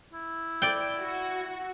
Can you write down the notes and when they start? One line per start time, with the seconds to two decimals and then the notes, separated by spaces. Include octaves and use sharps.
0.13 E4
0.62 D5 G5
1.01 F#4